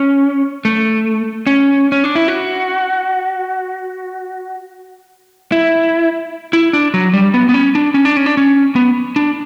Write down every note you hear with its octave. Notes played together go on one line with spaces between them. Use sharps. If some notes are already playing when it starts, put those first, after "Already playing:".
Already playing: C#4
A3
C#4
C#4
D4
E4
F#4
E4
E4
D4
F#3
G3
B3
B3
C#4
D4
C#4
D4
C#4
D4
C#4
B3
D4